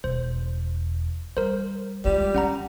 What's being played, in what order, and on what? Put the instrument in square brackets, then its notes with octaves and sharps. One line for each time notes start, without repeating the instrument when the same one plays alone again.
[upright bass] E1 [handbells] C5
[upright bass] G3 [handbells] A#4 C5
[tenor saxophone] G3 [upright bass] G#3 F4
[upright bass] D3 [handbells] C#4 F#5 A#5